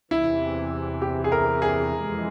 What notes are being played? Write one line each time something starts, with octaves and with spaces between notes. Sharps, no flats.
E2 C3 E3 E4
G4
G#4
A#4
G#4
F2 E3 G#3